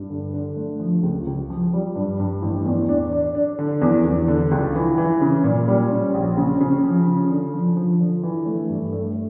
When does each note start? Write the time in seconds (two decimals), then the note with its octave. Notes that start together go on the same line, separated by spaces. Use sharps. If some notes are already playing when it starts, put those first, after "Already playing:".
Already playing: G2
0.10 D3
0.34 D3
0.56 A3
0.80 F3
1.03 C#2
1.27 C#2
1.50 F3
1.73 G3
1.96 G2
2.19 G2
2.42 A1
2.66 E2
2.89 D4
3.13 D4
3.35 D4
3.59 D3
3.82 E2
4.05 E2
4.28 D3
4.51 C#2
4.75 E3
4.98 E3
5.21 C#3
5.44 A#2
5.68 G3
5.91 C#4
6.14 A#1
6.37 C#3
6.61 C#3
6.84 F3
7.07 C#3
7.30 D3
7.53 F3
7.77 F3
8.00 D3
8.23 E3
8.46 A3
8.70 G2
8.93 A3